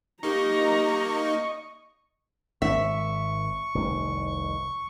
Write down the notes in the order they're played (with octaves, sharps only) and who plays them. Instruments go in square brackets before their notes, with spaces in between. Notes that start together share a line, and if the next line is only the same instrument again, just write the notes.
[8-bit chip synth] A#3 D#4 [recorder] G4 [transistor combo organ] D#5 C#6 [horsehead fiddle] A#5
[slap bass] G#1 [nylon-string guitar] E5 [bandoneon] C#6
[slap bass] F1 C2 D#3